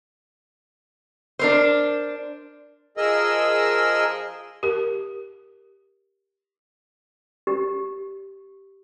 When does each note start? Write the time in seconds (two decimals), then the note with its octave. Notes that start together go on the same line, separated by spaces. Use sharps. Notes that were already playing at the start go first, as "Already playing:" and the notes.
1.39 D4 A#4 C5
2.97 F3 G#4 A#4 D#5 E6
4.63 G4 A#4
7.47 G4